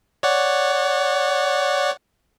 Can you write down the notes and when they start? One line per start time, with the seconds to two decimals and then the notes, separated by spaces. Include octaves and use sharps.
0.23 C#5 D5 F#5